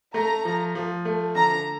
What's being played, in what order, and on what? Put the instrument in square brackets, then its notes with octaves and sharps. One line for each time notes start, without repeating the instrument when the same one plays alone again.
[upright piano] A3 [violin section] A#5
[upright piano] F3
F3
A3
[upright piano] D3 [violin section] A#5